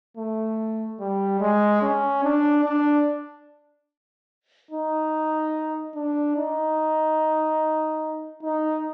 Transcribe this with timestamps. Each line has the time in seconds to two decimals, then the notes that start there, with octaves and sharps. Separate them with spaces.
0.17 A3
1.00 G3
1.41 G#3
1.82 C#4
2.24 D4
2.65 D4
4.71 D#4
5.95 D4
6.37 D#4
8.43 D#4